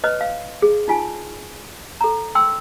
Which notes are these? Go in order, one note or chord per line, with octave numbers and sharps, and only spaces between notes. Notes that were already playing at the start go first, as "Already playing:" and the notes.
B4 C#5 D#5
F5
G#4
D#4 F4 G#5
A4 A#5
G5 C6 E6